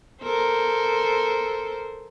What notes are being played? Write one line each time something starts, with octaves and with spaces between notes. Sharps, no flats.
A4 A#4 C5